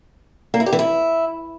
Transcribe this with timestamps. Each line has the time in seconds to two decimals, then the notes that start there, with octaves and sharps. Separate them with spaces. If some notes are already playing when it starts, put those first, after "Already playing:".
0.54 A#3
0.60 E4
0.66 G4
0.73 E3
0.79 E4